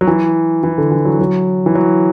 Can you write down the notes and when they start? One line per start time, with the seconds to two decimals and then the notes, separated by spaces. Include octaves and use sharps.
0.01 F#3
0.07 E3
0.63 E3
0.78 D3
0.92 E3
1.05 F#3
1.19 F#3
1.66 E3
1.75 F#3